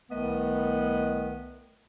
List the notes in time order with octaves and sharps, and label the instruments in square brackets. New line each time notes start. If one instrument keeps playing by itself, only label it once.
[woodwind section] C2 D#3 A3 B3 B4 D#5